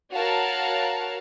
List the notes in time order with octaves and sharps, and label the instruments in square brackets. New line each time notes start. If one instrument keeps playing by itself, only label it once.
[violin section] F#4 A#4 C#5 F5 F#5 A5